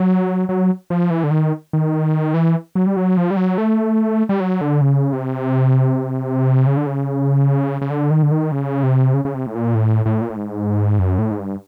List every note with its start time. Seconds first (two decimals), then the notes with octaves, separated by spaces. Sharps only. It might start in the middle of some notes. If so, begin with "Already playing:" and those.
Already playing: F#3
0.49 F#3
0.90 F3
1.10 E3
1.24 D3
1.31 D#3
1.73 D#3
2.34 E3
2.75 F#3
2.87 G3
2.97 F#3
3.17 F3
3.31 G3
3.37 F#3
3.58 A3
4.29 G3
4.40 F#3
4.61 D3
4.81 C#3
5.13 C3
6.67 C#3
6.77 D3
6.86 C#3
7.81 C#3
7.90 D3
8.11 D#3
8.23 D3
8.31 D#3
8.52 C#3
8.83 C3
9.14 C#3
9.25 C#3
9.34 C3
9.46 A2
9.55 A#2
9.75 A2
10.06 A2
10.22 A#2
10.30 A2
10.36 G#2
10.99 F#2
11.19 A2
11.31 G#2
11.40 G2